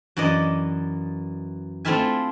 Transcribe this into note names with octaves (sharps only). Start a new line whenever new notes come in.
F#2 E3 E4 D5 D#5
A3 C4 E4 F4 E5 G#5